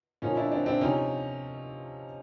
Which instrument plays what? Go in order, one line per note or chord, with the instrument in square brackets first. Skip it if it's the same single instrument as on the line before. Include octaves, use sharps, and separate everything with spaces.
[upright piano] A#2 F3 C#4 D#4
D4 E4
C4 D4
C4 D4
C3 F3 C#4 D#4